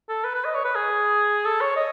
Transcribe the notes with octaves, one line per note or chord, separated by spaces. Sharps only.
A4
B4
B4
D#5
C#5
B4
G#4
A4
C#5
D#5